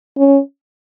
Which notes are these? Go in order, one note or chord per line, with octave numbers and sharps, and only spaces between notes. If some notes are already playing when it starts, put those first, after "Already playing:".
C#4